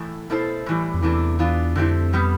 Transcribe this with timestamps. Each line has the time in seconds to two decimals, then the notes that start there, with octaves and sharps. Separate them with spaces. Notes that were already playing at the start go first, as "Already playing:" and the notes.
Already playing: A2 E3 A3
0.30 B2 A3 E4 A4 C5
0.66 A2 E3 G3
0.94 F2
1.02 E2 C3 E3 A3 D4
1.39 E3 B3 D4 F4
1.76 F2 D3 A3 C4 E4 G4
2.13 B2 G3 B3